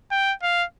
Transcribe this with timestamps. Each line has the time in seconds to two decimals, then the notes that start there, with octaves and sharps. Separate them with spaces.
0.11 G5
0.43 F5